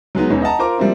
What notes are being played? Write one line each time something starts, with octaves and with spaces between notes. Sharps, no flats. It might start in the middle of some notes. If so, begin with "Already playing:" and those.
F#3 G#3 B3 D#4
E1 E2 C#4 D#4
D#5 F#5 A5 A#5
F4 A#4 C5 A#5 D6
F3 G3 A#3 C4 E4